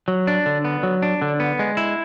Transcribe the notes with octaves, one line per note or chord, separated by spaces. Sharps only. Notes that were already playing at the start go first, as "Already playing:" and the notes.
F#3
D4
D3
B3
F#3
D4
D3
B3
G#3
E4